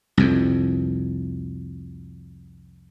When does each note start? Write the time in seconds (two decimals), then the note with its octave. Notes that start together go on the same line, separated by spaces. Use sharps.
0.17 C2 F2